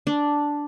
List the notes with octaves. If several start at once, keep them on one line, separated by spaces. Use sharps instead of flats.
D4